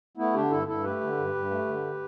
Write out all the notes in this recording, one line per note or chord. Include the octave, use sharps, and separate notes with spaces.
A3 B3 E4
D3 D4 G4
G2 E4 A4
G2 E4 A4
A3 G4 B4
D3
G2
G2
A3
D3